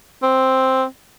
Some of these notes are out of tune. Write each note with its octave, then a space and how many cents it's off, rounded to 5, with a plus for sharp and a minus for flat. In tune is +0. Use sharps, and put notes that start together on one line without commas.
C4 +5